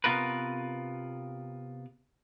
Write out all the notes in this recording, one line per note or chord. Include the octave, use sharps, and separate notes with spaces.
C3 B3 F4 A#4 B4